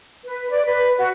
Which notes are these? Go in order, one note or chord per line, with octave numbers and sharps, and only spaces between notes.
B4
D5
B4
F#4